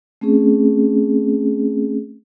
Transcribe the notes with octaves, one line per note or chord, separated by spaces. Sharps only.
A3 C4 C#4 G#4